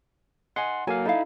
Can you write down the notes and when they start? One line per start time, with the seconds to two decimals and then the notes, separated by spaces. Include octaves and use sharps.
0.56 D#5 F#5 G#5 C6
0.87 F#3 A#3 A4 F5 G#5 A5
1.06 D#4 E4 A4 F5